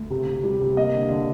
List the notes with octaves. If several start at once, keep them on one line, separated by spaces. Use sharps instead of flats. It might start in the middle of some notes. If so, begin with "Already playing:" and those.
Already playing: D2
C3
C3
G3
C3
A#3 D#5
D3
D3